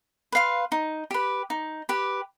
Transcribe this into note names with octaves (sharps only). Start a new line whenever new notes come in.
B4 F5 C6
D#4
G4 B4
D#4
G4 B4